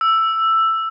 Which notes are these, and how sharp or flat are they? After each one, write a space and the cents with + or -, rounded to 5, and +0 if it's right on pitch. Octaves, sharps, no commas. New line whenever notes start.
E6 +5